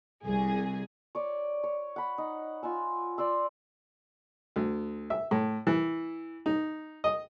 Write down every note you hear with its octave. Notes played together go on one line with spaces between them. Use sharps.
C2 G#4
C#5 D5
C#5
F#5 B5
D#4
F4 F#5 G#5 E6
C5 D5 C6 E6
D2
E5
A2
E3
D#4
D#5